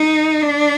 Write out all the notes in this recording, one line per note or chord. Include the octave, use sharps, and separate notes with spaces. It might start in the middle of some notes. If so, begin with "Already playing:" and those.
Already playing: D#4
D4